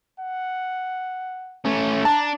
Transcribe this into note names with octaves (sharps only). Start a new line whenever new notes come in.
F#5
A3 C#4
D4 A5 A#5